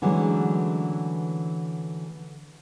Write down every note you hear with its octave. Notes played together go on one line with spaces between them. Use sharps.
D3 E3 F#3 G#3 A3 C#4